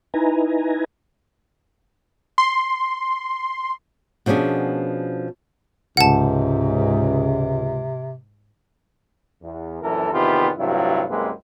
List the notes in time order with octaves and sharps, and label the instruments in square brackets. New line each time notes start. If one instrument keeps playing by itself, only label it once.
[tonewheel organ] D#4 E4 B4 G#5 A#5
[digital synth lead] C6
[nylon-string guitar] B2 F3 C#4 D4 G#4
[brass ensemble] C#2 [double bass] G#2 [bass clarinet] C3 [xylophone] F#5 A5
[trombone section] E2
A#1 F#2 E3 A4 A#4
E2 C3 D#3 B3 F4 G4
A1 G2 C3 F#3 E4 F4
C2 F#2 G#3 A#3 C4 B4